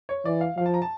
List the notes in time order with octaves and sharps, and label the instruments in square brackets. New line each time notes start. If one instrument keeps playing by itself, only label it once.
[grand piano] C#5
[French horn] E3 [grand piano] D5
[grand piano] F5
[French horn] F3 [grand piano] F5
[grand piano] A5
A#5
A5